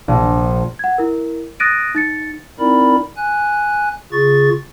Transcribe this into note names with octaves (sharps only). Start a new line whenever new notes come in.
A#1
F#5 G#6
E4 A#4
D#6 F#6 A6 A#6 D7 D#7
D#4 A6 C#7
C4 D#4 E4 A#4 D5 B5
G#5 F#6
C#3 F4 G#4 C#6 A6